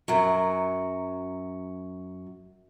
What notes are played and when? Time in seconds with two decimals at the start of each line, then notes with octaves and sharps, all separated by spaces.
0.08 F#2 F#3